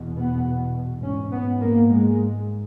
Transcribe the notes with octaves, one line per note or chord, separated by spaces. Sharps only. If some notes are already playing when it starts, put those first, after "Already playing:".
Already playing: E2 B2
B3
G#2 C#4
B3
A#3
G#3